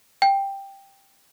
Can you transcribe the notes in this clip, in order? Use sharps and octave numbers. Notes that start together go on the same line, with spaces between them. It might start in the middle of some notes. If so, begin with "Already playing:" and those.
G5